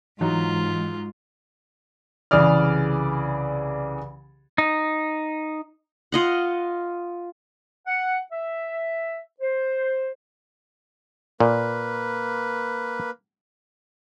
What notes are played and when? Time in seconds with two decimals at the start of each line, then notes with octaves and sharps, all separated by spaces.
0.21 G#2 E3 F#3 D#4 F4
2.31 C2 C#3 E3 G#4 D5 F6
4.58 D#4
6.12 F4 D#5 F#5
7.87 F#5
8.31 E5
9.41 C5
11.40 A#2 A#3 B4